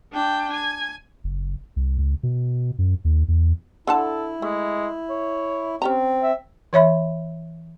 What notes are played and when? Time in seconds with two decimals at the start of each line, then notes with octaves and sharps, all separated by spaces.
0.13 D4 G5
0.53 G#5
1.24 F#1
1.76 C2
1.98 C#2
2.23 B2
2.78 F#2
3.05 D#2
3.28 E2
3.87 D3 E4 A4 F#5 A5
4.42 G#3 A3
5.10 C#5
5.82 C4 C#4 G4 A#5
6.23 E5
6.73 E3 C#5 E5 B5